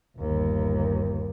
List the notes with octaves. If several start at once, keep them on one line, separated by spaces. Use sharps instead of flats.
G1 D#2